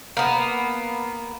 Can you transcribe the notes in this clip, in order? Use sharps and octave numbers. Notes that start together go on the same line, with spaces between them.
A#3 B3